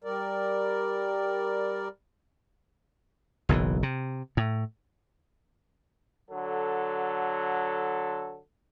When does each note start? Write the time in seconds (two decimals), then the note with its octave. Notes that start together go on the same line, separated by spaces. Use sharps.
0.04 G3 A#4 D5
3.49 F#1 B1 A2 E3
3.83 C3
4.37 A2
6.31 D3 F#3 A4